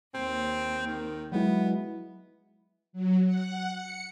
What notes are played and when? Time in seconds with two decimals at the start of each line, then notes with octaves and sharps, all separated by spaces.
0.14 D#2 C4
0.87 D#3
1.32 F#3 G#3 B3 E4
2.93 F#3
3.25 F#5
3.71 C#7